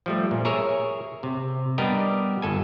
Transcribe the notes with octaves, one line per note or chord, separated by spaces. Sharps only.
F3 G3 A3
A#2
G#4 A#4 C#5 E5
C3
G3 B3 D4 G4 A#4 D#5
G1 A4 G#5